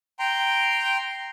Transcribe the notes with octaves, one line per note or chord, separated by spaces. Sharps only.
G5 A#5 C6